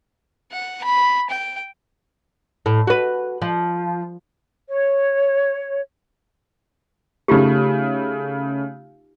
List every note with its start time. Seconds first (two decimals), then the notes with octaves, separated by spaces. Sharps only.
0.52 F#5
0.85 B5
1.30 G5
2.66 A2
2.87 F#4 B4
3.42 F3
4.69 C#5
7.28 C#3 A3 D#4 F4 G4